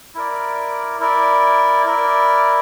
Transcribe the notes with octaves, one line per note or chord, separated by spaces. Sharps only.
E4 A#4 D5
E4 A#4 D5
E4 A#4 D5